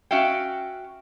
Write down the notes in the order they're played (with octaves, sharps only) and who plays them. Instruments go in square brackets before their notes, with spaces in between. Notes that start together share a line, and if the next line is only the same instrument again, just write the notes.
[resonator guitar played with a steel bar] C#4 F#4 E5 F5 G5